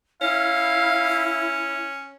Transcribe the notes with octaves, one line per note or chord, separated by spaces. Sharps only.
C#4 E4 F5